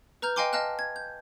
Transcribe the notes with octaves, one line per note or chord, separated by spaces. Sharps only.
B4 A#5 F6 G6
D#5 F5 G5 G#5 C6 D6
D#5 F5 A5 F6 F#6
G#6
G6